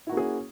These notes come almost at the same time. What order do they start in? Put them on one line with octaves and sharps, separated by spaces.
E4 F#4 A#3 C#4 G#4